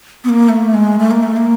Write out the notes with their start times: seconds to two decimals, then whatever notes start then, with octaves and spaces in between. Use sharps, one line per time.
0.24 B3
0.29 A#3
0.49 A3
0.74 G#3
0.99 A3
1.11 A#3
1.23 A3
1.36 A#3